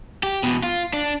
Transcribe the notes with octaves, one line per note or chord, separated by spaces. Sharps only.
G4
E2 B2
F4
D4